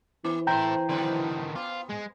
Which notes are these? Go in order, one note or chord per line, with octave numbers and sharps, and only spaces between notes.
E3 B3
C4 E4 A4 C5 G5 A#5 G6
D3 D#3 F#3 C4 B4
B3 F4
G#3